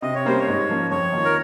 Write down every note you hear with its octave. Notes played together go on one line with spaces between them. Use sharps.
C3 D#5
C#5
G3 A#3 C#4 C5
C#5
G#2
F3 A#3 C#4
F2 C#5
D#3 A#3 F4
A#4